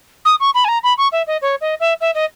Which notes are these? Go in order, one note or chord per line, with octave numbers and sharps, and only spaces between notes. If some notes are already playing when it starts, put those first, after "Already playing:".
D#6
C#6
B5
G#5
A#5
B5
C#6
E5
D#5
C#5
D#5
E5
E5
D#5